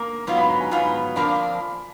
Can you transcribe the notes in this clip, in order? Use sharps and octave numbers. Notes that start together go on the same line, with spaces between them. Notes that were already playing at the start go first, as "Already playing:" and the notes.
Already playing: A#3 A#5
G#2 F#3 B3 F4
B5
A#5
G#5
G#2 F#3 B3 F4
F2 F3 A#3 D4 B5